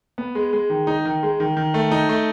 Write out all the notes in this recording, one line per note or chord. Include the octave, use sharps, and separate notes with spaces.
B3
G#3
G#3
D#3
D#4
D#3
G#3
D#3
D#3
A3
D#4
A3